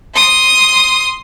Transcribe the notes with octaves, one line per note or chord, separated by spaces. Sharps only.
C6 D#6